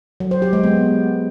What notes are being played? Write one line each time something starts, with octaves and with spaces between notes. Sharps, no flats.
F#3
C5
G4
G#3
B3